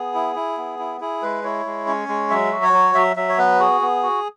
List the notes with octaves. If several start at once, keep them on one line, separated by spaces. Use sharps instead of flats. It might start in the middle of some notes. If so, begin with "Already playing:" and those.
Already playing: B3 G#4
E4
E4
B3
E4
E4 G#4
G#3 B4
E4 C#5
G#3
C#4
G#3
F#3 E5
F#4
C#5
F#3
F#3 E5
F#3 E5
C#5
B3 B4
F#4 G#4
B3
F#4